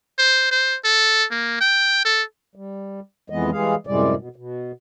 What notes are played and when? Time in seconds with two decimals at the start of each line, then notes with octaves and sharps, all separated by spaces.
0.18 C5
0.51 C5
0.84 A4
1.31 A#3
1.61 G5
2.05 A4
2.55 G3
3.30 F2 E3 G#3 B3 D#5
3.52 E3 G3 G#3 G#4 F5
3.87 F#2 A2 C3 G3 G#3 D5
4.17 B2
4.36 B2